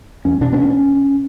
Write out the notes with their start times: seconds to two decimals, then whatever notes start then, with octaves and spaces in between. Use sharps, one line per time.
0.25 E2 C#4
0.41 B2 D4
0.52 B3
0.58 C#4